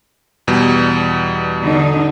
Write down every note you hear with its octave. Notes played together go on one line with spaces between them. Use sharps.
E2 B2 G3
D3 D4 D#4